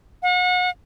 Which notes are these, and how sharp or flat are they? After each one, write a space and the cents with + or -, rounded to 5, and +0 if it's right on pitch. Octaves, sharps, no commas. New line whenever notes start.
F#5 -35